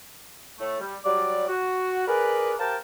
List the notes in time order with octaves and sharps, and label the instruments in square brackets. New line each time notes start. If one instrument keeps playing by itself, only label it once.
[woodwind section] A2 A3
G3
F#3 G3 D5
F#4
G#4 A#4 B4 D5
G4 A#4 C5 F5 G5 A5